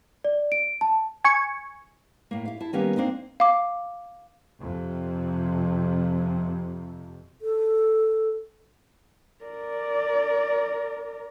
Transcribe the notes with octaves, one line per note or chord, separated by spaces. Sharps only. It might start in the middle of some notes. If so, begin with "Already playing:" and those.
D5
D7
A5
G#5 C#6
A2 A#3
E4 F5
E4 A5
D#3 G3 A#3 B3 C#4
A#3 C4 D4 D#4
F5 D6
F2 C3
A4
A#4 D5